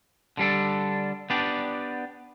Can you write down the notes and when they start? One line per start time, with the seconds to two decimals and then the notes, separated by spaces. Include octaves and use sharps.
0.37 D3 G3 D4 A4
1.30 B3 D4 G4 D5